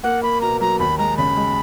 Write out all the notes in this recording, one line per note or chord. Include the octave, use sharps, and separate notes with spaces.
A#3 F#5
A#3 B5
B2 A#5
F#3 A#5
D#2 B5
G#3 A#5
C#3 B5
G#3